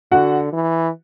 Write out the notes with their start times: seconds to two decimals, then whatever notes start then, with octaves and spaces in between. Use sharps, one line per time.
0.12 D3 F#4 F#5
0.52 E3